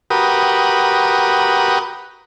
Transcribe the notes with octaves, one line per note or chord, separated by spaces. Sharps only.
F#4 G4 A#4 B4 D#6